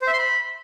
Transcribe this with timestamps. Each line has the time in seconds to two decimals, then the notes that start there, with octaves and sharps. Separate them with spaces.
0.02 C5
0.07 E5
0.13 C6
0.18 B5